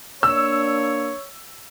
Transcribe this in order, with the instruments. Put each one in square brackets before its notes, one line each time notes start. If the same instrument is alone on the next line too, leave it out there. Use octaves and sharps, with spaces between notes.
[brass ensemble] A#3 D4 [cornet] C#5 [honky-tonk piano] E6